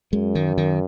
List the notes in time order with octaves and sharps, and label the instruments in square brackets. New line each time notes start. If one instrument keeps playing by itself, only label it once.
[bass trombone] F#2 [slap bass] G#3
[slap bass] D#3
D#3